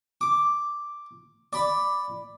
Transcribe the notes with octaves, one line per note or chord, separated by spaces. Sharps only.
D6
D5 B5